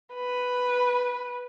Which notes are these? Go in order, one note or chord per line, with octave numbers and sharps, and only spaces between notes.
B4